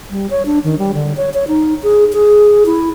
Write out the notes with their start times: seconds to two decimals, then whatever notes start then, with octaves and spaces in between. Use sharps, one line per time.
0.10 G3
0.30 C#5
0.46 D4
0.64 D#3
0.78 G3
0.94 D3
1.16 C#5
1.34 C#5
1.48 D#4
1.83 G#4
2.13 G#4
2.66 E4